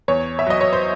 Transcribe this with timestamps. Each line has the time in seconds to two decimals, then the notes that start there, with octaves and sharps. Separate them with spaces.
0.08 E2 C#5
0.39 E5
0.46 F#3 D#5
0.61 C#5
0.73 C5